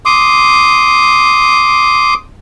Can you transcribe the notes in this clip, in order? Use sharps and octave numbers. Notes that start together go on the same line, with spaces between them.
C6 D6 D#6